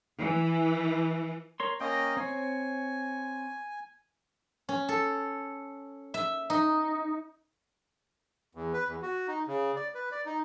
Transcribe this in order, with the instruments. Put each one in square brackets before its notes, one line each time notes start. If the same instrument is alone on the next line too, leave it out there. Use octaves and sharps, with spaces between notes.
[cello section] E3
[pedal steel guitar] A#4 C#5 C6
[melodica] A#3 C#4 D#5 [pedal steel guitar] G5 A#5
[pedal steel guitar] C4 C#5 [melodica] G#5
[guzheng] C#4
A4
E5
D#4
[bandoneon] E2
B4
E2
F#4
D#4
C#3
D5
B4
D5
D#4